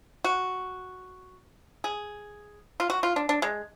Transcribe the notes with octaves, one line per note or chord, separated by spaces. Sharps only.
F#4
G#4
F4
F#4
F4
D4
D4
G#3